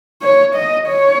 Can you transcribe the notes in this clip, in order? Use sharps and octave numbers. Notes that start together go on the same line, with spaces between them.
C#5
D#5
C#5